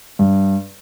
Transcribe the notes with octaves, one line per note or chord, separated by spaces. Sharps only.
G2